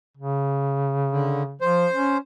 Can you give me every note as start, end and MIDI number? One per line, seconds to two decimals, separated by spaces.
0.17 1.56 49
1.11 1.43 50
1.61 1.87 53
1.61 2.17 72
1.93 2.18 61